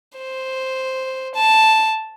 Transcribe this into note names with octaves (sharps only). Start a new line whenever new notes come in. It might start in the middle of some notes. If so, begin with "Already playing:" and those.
C5
A5